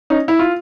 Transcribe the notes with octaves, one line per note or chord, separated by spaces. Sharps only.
C#4 D#4
E4
F4